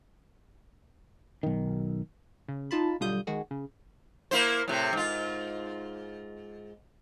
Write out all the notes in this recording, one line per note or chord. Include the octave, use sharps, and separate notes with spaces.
B1 D#3
C#3
D#4 F4 A5 B5
B1 D3 G3 F4 D#6 G6
D#3 G#3 F#4 G#4
C#3
A#3 E4 C5
A2 C3
G#2 F4